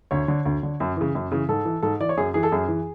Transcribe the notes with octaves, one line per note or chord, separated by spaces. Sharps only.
D2 C#5
D3
D2
D3
F#2
C#3 E3
F#2
C#3 E3
G#2 A4
E3
G#2 A4
E3 D5
C#5
F#2 G#4
E3 G#4
A4
F#2 G#4
E3